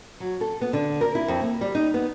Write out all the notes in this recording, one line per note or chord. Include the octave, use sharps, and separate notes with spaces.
F#3
A4
B3
D3
A#4
E4
F2
A#3
G3
D#4
B3